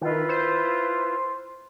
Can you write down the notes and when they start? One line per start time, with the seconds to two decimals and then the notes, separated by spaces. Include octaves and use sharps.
0.01 D#3 E4 F4 B4
0.29 C5